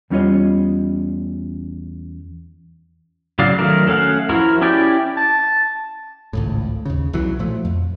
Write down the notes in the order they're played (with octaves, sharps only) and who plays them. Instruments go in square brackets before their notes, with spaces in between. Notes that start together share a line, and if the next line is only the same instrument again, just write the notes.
[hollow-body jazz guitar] E2 G3 C#4 F4 C#5 D#5
[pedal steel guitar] C#3 F#3 D5 F5
D#3 F#3 A3 A#4
A3 C#4 F5 F#5
F3 E4 F#4 A#4
C#4 E4 G4 D5 G5
[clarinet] A5
[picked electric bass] G#1 C#2 A2
D#2 C#3
B1 E3 F#3
A#2 F3 A3
F2